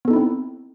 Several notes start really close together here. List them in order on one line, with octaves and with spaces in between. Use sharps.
B3 A4 D#4 E4 C4